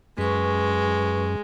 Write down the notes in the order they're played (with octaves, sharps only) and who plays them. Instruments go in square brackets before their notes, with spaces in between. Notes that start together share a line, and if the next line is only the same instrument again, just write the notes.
[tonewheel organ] F#2 [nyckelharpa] G#3 [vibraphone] B4 C#6